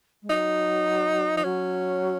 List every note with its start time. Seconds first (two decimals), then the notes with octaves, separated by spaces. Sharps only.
0.22 G#3
0.29 F#3 D#4
1.36 F3 D#4
1.44 F#3 C#4